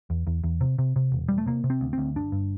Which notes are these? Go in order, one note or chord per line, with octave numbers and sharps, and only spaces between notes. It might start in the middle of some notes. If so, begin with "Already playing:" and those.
E2
E2
E2
C3
C3
C3
E1
E1 G3
A3
C3 A#3
C3
C4
D2
D2 C4
G1 D4
G2